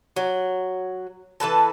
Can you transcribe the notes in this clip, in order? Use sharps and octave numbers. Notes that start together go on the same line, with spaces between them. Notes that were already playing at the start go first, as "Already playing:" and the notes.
F#3
E3 A4 B4 A5